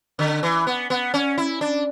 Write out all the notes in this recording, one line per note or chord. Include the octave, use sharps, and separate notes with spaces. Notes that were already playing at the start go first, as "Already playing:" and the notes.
D3
E3
B3
B3
C#4
E4
D4